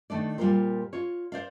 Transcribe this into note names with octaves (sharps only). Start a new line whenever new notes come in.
D#3 A3 D4 D5
A#2 G3 F4 G4 A#4 C5
F4 C#5
C5 D5 F5